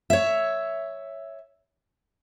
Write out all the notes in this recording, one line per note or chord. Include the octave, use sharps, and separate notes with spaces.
C#5 E5